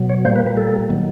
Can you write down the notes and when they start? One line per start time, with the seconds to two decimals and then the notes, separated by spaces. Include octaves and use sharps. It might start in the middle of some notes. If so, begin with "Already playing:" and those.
Already playing: B2 F#3
0.09 C#5
0.25 A#2 G3 A#3 C5
0.36 B4
0.46 B4
0.57 A4
0.90 D#3 F#3